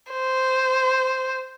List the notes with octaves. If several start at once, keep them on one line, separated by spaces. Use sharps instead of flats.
C5